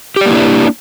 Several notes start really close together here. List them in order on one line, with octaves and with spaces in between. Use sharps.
G4 D5 A#3 E4 D4